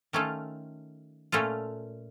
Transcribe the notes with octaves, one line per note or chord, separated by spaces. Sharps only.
D#3 A3 C#4 F4 A4
A#2 A3 C#4 F4 A4